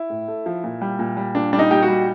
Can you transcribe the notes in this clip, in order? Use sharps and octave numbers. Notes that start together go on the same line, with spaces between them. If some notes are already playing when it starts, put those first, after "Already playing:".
Already playing: E4
A2
A3
F3
A#2
G3
A#2
G3
A#2 D4
G3 D4
D#4
A#2 G4
F#4
G3